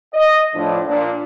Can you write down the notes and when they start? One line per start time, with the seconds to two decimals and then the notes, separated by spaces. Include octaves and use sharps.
0.14 D#5
0.55 A2 F3 D4
0.87 A#2 D4